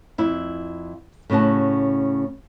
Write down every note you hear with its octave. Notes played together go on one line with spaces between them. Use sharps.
F2 E4
A2 C#3 C#4 F#4 A5